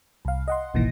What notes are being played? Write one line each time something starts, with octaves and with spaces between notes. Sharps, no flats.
C2 F5
D#5 F#5 C6
G1 C2 A#2 D#3 E3 A#6